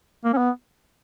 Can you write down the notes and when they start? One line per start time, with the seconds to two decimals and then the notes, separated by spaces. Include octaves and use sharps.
0.25 A#3
0.34 C#4
0.38 B3